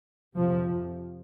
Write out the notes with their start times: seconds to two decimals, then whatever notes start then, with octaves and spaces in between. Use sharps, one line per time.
0.36 F2 C3 F3